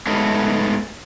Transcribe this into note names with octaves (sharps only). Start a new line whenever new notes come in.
G#2 G#3 A3 B3 C#4